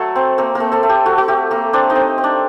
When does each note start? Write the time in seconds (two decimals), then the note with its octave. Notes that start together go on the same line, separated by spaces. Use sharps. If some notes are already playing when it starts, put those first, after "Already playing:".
Already playing: F#3 A3 A4
0.16 C4
0.38 A#3 C4 A#4
0.55 A3 A#3 A#4
0.72 A3 A4
0.83 A3
0.89 G4
1.06 A3 F#4
1.18 F#4
1.28 A3 G4
1.51 A3 A#3 A#4
1.73 C4 D4 D5
1.90 D#4 D#5
1.95 C4
2.18 C4
2.24 D4 D5